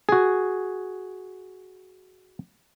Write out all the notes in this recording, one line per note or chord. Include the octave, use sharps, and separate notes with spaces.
F#4 G#4